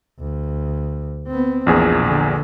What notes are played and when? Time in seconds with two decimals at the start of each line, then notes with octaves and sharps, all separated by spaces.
0.19 D2
1.27 B3 C4
1.66 A#1 E2 A#2 G#4
2.05 D3